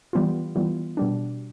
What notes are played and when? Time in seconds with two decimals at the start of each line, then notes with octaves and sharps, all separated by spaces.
0.13 E3 G3 B3 F4
0.56 E3 G3 B3 F4
0.97 B2 G3 D4